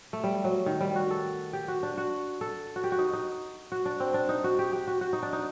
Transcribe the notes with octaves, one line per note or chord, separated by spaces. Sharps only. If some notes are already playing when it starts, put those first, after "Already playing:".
A3
G3
F#3
D#3
G3
F#4
A4
G4
F#4
D4
F#4
A4
F#4
G4
F#4
D#4
D#4
F#4
D4
C4
D4
D#4
F#4
G4
G4
F#4
F#4
D#4
D4
D#4